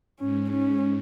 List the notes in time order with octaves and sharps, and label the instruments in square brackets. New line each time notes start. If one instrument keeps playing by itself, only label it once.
[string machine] G#2 [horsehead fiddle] C#4
[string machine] G#2 [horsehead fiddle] C#4